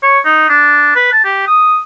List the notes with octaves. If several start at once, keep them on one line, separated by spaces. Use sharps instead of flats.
C#5
D#4
D4
B4
A5
G4
D#6